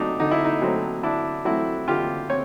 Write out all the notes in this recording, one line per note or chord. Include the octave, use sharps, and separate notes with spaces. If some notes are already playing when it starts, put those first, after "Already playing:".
Already playing: D3 F#3 A3 C4 D4 D#4
D3 D#4
E4
D#4
F#3 A3 C4
D3 D4 E4
F#3 A3 C4 E4 F#4
D3 F4 G4
C4 C#5